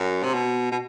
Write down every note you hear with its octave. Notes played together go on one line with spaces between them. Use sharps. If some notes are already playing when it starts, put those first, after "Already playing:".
Already playing: F#2
C3
B2
B2